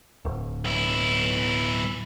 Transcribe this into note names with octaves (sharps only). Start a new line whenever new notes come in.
D1
B1 E4